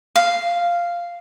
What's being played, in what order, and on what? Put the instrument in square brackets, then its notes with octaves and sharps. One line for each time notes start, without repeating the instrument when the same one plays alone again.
[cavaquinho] F5